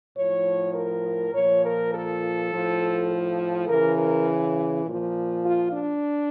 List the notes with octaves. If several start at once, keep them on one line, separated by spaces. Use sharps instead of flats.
A2 F3 C#5
A#4
A#2 F3 C#5
A#4
A4
A2 F3
A4
C#3 E3 A#4
A#4
A#2 F3
F4
D4